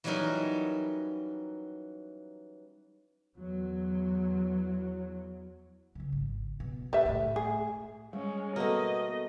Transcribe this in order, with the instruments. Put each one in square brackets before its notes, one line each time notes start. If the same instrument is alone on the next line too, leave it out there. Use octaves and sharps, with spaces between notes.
[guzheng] E3 F#3 G3 C#4 D#4 A#4
[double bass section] E2 F#3
[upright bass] C#3 E3
G#1
B2
[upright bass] A#1 [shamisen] G3 B4 E5
[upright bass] A2 A3
[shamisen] G#4
[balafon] G3 [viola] G#3 C#4
[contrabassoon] B2 [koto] A3 A#3 [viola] D#5